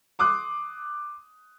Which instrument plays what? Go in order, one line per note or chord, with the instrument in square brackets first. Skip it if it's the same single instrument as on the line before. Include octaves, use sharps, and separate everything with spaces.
[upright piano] C6 D6 D#6 F#6